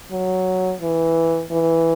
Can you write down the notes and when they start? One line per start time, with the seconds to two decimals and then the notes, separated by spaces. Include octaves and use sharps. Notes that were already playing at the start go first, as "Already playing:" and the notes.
0.11 F#3
0.81 E3
1.51 E3